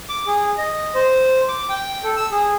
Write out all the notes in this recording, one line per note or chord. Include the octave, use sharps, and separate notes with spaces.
D6
G#4
D#5
C5
D6
G5
A4
E6
G#4